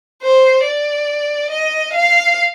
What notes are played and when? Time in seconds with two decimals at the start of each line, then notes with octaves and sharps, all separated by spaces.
0.23 C5
0.65 D5
1.50 D#5
1.93 F5